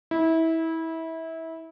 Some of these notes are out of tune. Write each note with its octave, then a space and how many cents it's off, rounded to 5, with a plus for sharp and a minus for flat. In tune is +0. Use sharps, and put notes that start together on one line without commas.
E4 -25